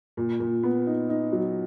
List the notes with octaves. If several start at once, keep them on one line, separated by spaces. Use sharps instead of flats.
A#2
A#2
B3
D#4
D#4
F#3